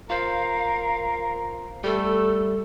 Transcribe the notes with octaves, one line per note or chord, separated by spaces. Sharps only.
F4 A#4 C5 F5
G3 A3 A4